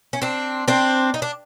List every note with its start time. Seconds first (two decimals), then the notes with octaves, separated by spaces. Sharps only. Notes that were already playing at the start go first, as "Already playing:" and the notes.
0.13 C#4
0.22 C4 D4
0.68 C4 D4
1.14 D#4
1.22 D4